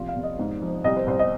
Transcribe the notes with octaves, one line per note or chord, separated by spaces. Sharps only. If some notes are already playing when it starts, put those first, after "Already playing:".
Already playing: F1 A#1 F4
F5
F1
D#5
G#2
F3
C2 D#5
C5
C2 C5
D#5